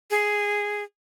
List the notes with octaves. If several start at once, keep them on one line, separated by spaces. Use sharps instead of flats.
G#4